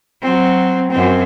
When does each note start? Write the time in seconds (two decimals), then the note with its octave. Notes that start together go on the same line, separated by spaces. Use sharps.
0.22 F#3 C4
0.91 F#2 C4